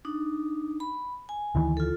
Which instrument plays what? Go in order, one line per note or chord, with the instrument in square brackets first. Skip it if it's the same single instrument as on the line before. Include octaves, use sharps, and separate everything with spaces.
[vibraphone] D4 D#4
B5
G#5
[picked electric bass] D2 D#3 E3
[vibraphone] F4 A4